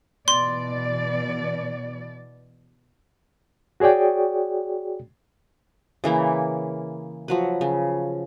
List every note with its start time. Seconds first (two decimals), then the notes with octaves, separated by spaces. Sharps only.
0.28 B2 E3 D5 C6
3.80 F#4 G#4 C#5 D5 G5
6.04 C#3 E3 A#3 E4
7.28 F3 F#3 B4
7.61 C#3